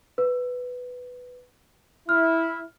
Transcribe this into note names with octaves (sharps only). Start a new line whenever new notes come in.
B4
E4 F6